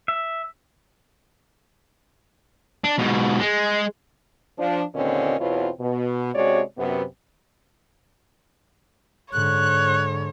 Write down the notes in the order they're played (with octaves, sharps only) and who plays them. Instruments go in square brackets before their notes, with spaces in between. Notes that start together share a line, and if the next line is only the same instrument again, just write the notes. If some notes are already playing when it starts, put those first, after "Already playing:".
[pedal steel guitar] E5
[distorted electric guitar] D4
G#2 B2
G#3
[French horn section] F3 D4
D#2 A#2 D3 C4 C#4 D#5
E2 B2 C4 E4 F4 C#5
B2
C3 G#3 C#4 F#4 C#5 D5
F#2 C3 B3
[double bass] G#2 D3 [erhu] C#5 [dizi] F#6